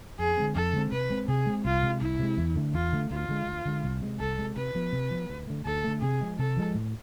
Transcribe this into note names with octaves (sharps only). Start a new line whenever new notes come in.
F2 G#4
D3 G#3 C4
F2 A4
D3 G#3 C4
C3 B4
G#3 C4
C3 G#4
G#3 C4
C2 F4
C3 G#3
C2 E4
C3 G#3
E2
D3 A3
E2 F4
D3 A3
D2 F4
D3 G#3
D2
D3 G#3
C2
C3 G#3
C2 A4
C3 G#3
C3 B4
F3 B3
C3
F3 B3
D2
D3 A3
D2 A4
D3 A3
C3 G#4
F3 G#3
C3 A4
F3 G#3
A2